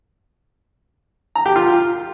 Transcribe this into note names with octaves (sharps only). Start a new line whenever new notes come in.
A#5
G4
F4